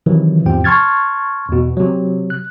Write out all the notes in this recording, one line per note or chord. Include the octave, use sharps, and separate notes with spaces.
C3 D#3 E3 F#3
E2 G#2 C3 F3 G5
A5 C6 C#6 F6 G#6 A6
E2 B2
C3 F#3
F#6